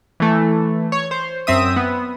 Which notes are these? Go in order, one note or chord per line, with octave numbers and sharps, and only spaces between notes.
E3 A3
C#5
C5
F#2 C4 E5 D#6
B3